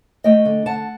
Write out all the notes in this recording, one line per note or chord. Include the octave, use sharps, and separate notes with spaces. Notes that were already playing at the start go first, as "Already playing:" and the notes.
A3 D#5 G5
D3
D3 F#5 A5